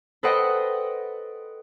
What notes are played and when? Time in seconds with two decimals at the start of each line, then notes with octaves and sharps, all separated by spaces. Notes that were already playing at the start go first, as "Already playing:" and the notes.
0.23 A4 B4 C5 D#5 F#5 G5